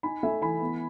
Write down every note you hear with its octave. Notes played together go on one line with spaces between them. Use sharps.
D#4 G#5 B5
A3 E5 G#5
E3 G#5 B5
B3